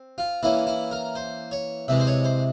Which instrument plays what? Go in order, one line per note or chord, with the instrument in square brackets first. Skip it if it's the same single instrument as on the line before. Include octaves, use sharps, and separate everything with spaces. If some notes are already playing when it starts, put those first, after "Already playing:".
Already playing: [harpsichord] C4
F4
E3 A#3 C#4 E4
E4
A#4
C5
C#5
C3 E3 G#3 E5
C5
C#5
C5